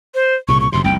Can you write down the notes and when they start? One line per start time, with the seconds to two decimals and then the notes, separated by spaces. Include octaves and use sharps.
0.14 C5
0.48 C2 A#2 C#3 C#6
0.60 C#6
0.72 F#1 F#2 C3 C6
0.84 F1 C2 G5